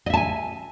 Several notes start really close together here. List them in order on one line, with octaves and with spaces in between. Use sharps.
D#5 E5 A5 G#5